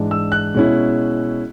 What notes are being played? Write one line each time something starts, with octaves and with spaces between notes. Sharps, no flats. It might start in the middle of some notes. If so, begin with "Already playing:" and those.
Already playing: G#2 E3 G#3 D4
E6
F#6
B2 G#3 C#4 E4